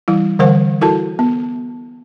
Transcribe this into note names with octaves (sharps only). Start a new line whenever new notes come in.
E3 G3 E4
D3 E3 G3 A#4 C5 F#5
E4 F#4 A4 A#4 A5
B3